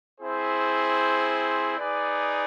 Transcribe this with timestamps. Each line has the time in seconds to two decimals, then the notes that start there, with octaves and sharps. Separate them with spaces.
0.20 C4 E4 G#4 C5
1.77 D#4 G#4 B4 D5